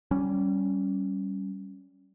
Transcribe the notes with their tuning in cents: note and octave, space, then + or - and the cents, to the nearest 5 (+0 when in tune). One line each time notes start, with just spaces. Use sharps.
G3 -15 C#4 +0